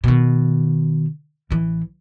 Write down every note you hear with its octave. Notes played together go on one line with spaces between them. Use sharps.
B2 D#3
A1 E3